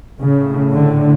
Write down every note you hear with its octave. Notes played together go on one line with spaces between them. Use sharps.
A2 C#3
D3